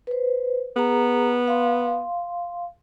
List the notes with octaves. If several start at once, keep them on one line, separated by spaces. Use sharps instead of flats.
B4 C5
B3 G#4 A#5
F5 C6